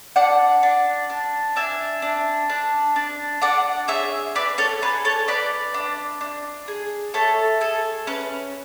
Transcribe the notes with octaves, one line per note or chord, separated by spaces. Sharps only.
D4 D5 F#5
D4
D4
D4 E5 G#5
D4
D4
D4
D4 D5 F#5
G#4 C#5 E5
D4 B4 D5
A4 C#5
G#4 B4
A4 C#5
D4 B4 D5
D4
D4
G#4
A3 A4 C#5
G#4 A4
C#4 B4